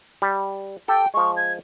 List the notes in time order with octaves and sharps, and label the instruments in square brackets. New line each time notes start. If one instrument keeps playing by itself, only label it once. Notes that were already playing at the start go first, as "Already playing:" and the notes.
[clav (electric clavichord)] G3
[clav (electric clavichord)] G4 A4 [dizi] G5
[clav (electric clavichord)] F3 G#3 [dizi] C#6
[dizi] G#6